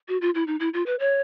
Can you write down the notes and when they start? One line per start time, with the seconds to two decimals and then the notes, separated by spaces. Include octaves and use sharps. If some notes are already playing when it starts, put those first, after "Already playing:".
0.08 F#4
0.21 F4
0.35 E4
0.47 D#4
0.60 E4
0.74 F4
0.86 B4
1.00 C#5